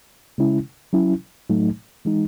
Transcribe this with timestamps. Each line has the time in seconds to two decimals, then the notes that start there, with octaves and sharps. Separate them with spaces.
0.38 C#3 G#3 C#4 E4
0.93 F#3 C#4 E4
1.49 A2 F#3 A3 D#4
2.05 E3 G#3 D#4